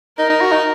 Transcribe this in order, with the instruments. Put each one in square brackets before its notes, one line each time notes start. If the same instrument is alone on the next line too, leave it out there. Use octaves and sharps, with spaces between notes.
[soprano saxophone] D#4 [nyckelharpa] A#4
[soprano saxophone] D#4
F#4
D#4